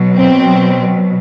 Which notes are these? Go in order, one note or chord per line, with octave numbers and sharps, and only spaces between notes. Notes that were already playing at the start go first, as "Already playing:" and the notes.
Already playing: B2 F#3
C4